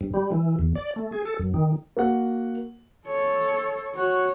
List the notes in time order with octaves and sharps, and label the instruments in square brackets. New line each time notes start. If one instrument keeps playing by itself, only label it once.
[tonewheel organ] G2
G3
E3
E2
D5
A3
G#4
A4
F#2
D#3
[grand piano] A#3 F#4 F#5
[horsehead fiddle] A4 C#5
[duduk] F#4 [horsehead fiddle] C#5